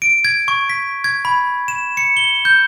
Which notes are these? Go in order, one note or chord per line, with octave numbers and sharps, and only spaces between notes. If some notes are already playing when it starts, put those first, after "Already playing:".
D7
G#6
C#6
B6
G#6
B5
E7
C#7
G7
G6